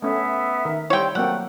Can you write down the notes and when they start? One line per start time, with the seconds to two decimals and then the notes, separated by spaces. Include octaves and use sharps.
0.02 A3 B3 C#4 E5
0.65 D#3 A#4
0.90 G3 C4 E4 C#5 G5
1.15 F#3 A3 A#3 C4 F#5 G5